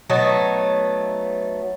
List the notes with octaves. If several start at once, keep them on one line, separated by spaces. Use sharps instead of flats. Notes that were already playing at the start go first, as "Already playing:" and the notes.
F#3 A3 B3 D#4